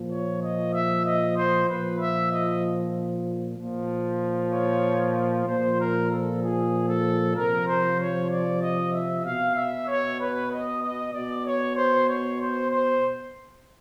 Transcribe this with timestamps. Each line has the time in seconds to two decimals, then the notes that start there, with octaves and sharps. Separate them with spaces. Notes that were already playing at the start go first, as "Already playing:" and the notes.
Already playing: A#2 F3
0.11 C#5
0.42 D#5
0.74 E5
1.05 D#5
1.37 C5
1.68 A#2 F3 B4
2.00 E5
2.31 D#5
3.57 A#2 F3
4.52 C#5
5.46 A#2 F3 C5
5.78 A#4
6.09 A4
6.41 G#4
6.88 A4
7.35 C3 F3 A#4
7.67 C5
7.99 C#5
8.30 D5
8.61 D#5
8.93 E5
9.25 B2 F5
9.56 E5
9.88 C#5
10.19 B4
10.51 D#5
10.82 D#5
11.13 B2 D5
11.45 C#5
11.76 C5
12.08 C#5
12.40 C5
12.71 C5